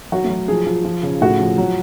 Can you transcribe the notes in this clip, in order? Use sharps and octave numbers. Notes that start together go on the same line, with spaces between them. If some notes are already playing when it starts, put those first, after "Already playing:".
F#3 F#4
A3
F#3
F3 G#4
F3
F3
C#3
A2 F#4
F3
F#3